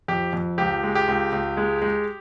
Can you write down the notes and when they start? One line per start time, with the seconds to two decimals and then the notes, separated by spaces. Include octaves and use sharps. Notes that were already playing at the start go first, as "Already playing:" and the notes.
0.08 F2 G4
0.33 F2
0.58 C#2 G4
0.83 G#3
0.95 G4
1.08 C#2
1.32 C#2
1.57 G#3
1.82 G#3